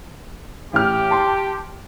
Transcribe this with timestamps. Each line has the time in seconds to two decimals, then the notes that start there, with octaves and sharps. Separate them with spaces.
0.73 A1 G4 F6
1.11 A5 C6